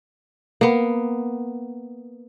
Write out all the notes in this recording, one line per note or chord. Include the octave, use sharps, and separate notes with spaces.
A#3 B3